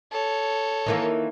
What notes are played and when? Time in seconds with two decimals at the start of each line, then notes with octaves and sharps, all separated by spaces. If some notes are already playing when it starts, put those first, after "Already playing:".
0.12 A4 C#5
0.86 D#3 E3 A#3